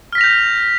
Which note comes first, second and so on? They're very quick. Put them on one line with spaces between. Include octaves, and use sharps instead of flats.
F6 B6 A#6 F7 G6